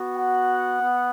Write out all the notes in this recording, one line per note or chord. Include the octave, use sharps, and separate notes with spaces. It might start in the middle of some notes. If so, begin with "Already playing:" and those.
Already playing: B3 F#4
F#5
B3